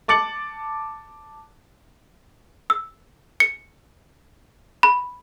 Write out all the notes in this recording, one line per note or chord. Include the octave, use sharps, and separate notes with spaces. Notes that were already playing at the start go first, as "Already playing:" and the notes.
A5 D6 A6 C#7 F#7
E6
C#7
B5